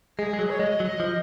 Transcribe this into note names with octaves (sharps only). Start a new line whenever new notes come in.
G#3 G#4
G#3
F#3
C#5
G#3 D#5
F#3
F3